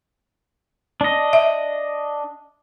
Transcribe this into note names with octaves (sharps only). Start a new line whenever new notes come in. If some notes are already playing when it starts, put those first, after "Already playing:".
D4 D#5
E5